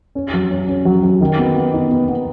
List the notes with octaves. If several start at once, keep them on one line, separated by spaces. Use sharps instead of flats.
C#4
F#3
C#4
C#4
F#3
F#3
D#3
B3
B3
D#4
B3
B3